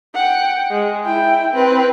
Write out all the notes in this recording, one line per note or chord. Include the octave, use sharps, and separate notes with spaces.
F#5 G5
G#3
E4 G5
C4 B4